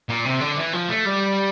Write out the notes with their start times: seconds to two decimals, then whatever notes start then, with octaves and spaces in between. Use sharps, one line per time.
0.09 A#2
0.25 C3
0.41 D3
0.57 E3
0.74 F3
0.89 A3
1.05 G3